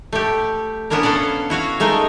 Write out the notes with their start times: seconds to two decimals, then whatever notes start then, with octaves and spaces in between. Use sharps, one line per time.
0.13 A3 G4
0.90 B3 C#4 D4 E4 A#4
1.03 B3 A4 F5 F#5
1.50 E4 F#4 C#5 F5
1.80 G#3 A3 D#4 A#4